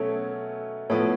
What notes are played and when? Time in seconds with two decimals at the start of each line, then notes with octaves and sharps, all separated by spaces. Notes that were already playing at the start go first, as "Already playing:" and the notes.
Already playing: B2 F#3 A3 C#4 A4 C#5
0.90 A2 F3 B3 A4 C#5